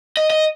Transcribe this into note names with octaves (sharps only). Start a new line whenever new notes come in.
D#5
D#5